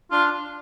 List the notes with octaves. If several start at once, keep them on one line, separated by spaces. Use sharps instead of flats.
D4 F4